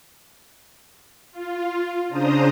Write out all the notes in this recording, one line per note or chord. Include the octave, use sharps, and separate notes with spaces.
F4
C#3 D4 C5 A#5 D#6